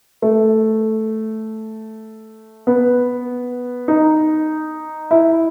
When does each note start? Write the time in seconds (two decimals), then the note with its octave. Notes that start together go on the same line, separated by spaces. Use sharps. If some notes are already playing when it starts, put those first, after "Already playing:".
0.22 A3
2.67 B3
3.88 D#4
5.11 E4